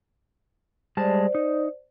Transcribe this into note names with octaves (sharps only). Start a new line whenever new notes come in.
G3 G#3 C5 D5 A5
D#4